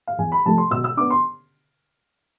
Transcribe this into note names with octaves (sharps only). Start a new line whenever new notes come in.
F5
E2 G#5
B5
C3 F3 A3 A5
C6
B2 E6
E6
B3 D4 D6
C6